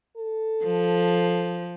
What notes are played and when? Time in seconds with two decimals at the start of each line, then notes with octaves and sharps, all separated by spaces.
0.17 A4
0.64 F3